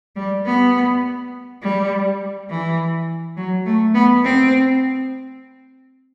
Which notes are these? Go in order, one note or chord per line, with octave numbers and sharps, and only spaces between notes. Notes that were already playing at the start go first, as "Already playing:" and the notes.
G3
B3
G3
E3
F#3
A3
B3
C4